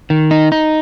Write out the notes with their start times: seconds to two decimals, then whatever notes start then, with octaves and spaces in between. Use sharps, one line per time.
0.10 D#3
0.31 D#4
0.52 D#4